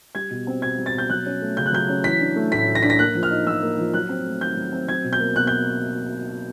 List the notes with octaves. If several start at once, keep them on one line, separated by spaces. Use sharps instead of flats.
G3 G#6
B2
C4
B2 G#6
G3
A6
B2 G6
F#3 F#6
C#4
A3
C#3 G6
F#6
F#3 G6
C#4
E3 B6
D4
A3
A2 B6
E3
A#6
D4 B6
A#6
A#3 F#6
F3
F6
D#4
F3 E6
A#3
F3
F#3 F#6
C4
A3
D#3 G6
F#3
C4
F#3 G#6
B2
G6
A#3
B2 F#6
G6